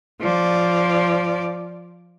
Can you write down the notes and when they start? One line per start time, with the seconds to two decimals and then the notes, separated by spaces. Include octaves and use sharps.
0.21 F3 D5